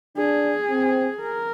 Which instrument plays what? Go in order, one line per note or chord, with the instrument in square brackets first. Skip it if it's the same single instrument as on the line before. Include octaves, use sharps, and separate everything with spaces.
[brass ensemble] D4 [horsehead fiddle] G#4
[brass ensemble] C4
[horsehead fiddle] A#4